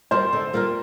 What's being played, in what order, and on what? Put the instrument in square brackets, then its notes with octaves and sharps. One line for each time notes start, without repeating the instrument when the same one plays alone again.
[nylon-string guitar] G3 A#3 F4 A#4 [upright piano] C5 C6
[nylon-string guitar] D3
G3 A#3 F4 A#4